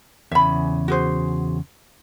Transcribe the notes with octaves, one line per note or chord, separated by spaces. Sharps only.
E2 C#3 E5 B5
F#4 G#4 C5